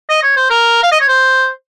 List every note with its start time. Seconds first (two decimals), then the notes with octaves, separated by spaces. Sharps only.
0.10 D#5
0.23 C#5
0.37 C5
0.50 A#4
0.83 F5
0.92 D#5
1.00 C#5
1.08 C5